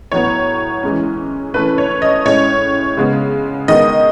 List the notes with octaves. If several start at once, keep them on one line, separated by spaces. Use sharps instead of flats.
A2 F#3 B3 C#5
E3 G#3 C#4
E3 A3 C#4 B4
C#5
D#5
A2 G#3 C#4 C#5
C#3 G#3 B3
D#3 G#3 B3 D#5